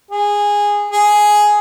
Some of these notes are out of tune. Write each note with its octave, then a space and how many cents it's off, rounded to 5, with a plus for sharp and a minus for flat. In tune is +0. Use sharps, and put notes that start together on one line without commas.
G#4 -15
G#4 +5